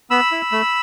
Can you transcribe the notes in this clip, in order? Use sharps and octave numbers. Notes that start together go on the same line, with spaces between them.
B3 B5 E6
E4
A3